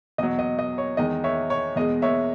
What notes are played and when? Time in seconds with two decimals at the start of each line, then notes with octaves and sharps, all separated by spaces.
0.18 E2 B2 F#3 D#5
0.39 D#5
0.59 D#5
0.78 C#5
0.97 E2 D#3 G#3 D#5
1.24 C#5 E5
1.50 C#5
1.76 E2 B2 G#3 D#5
2.02 C#5 E5